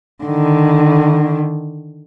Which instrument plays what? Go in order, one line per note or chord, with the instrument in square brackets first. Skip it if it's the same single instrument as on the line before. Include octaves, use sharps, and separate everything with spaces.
[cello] D3 D#3